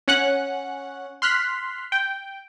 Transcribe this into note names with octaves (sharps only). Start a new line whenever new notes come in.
C#4 F#5 F#6
C6 F6 F#6 B6
G5